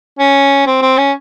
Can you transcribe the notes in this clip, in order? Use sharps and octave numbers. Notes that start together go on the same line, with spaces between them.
C#4
C4
C4
C#4